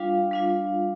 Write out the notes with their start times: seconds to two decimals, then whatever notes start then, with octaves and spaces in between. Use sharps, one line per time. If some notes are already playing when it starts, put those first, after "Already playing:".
Already playing: G3 D4 F4 F5
0.31 G3 D4 F4